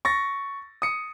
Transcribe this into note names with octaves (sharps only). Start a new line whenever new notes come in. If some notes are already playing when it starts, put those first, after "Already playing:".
C#6 A6 A#6
D#6 C#7